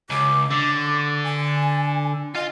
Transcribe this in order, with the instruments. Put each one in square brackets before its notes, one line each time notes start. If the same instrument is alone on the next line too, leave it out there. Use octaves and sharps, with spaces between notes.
[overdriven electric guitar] C#2 [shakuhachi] D6
[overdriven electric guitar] D3
[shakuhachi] G#5
[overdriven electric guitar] F4 F5 [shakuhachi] D#5